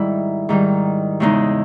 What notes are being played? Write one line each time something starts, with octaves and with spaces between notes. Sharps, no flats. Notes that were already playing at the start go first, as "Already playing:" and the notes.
Already playing: G#2 D#3 G3 E4
G#2 D#3 G3
E2 C#3 G#3 D#4